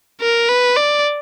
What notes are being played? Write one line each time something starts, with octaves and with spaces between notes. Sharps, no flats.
A#4
B4
D5